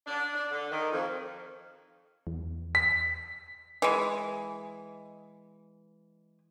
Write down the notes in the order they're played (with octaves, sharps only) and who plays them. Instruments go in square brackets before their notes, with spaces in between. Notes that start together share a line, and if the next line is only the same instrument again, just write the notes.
[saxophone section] D4
D4
D3
D#3
F2
[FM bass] E2
[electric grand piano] B6
[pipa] E3 G#3